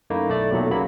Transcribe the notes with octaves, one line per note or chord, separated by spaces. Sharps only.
F#2 A3 A#3 D#4 E4
B1 A3 D5 E5
B1 E2 A#2 F#3 A3
C#3 F#3 A#3 B5